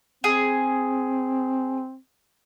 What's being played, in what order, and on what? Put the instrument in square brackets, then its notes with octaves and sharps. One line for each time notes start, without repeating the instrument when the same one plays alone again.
[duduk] C4 [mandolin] G#4